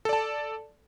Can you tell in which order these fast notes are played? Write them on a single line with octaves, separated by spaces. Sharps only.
A4 D5 A5